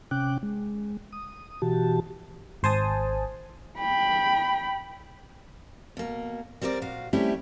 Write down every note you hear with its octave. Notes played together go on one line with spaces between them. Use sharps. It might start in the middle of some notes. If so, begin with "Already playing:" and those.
C3 C#4 G5 D6 F#6
G#3
D#6
B2 E3 F#4 G4 A5
G#1 C5 G#5 A5 D#6
G5 B5
B2 A#3
G3 C4 A#4 C5 D5
A#2 F#4 F5
G3 A3 C4 C#4 E4 G4